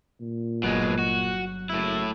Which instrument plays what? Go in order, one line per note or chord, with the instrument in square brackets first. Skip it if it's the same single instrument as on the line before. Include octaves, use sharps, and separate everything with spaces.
[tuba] A#2
[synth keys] G1 F#3 F#6 [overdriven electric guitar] B2 G#3
[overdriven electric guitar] F#4
[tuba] F#1 [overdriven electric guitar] A2 E4